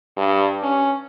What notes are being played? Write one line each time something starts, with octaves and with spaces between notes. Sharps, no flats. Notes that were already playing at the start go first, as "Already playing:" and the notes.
G2
C#4